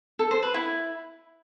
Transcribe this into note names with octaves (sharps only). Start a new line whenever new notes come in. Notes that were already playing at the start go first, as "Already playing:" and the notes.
A4
C5
B4
E4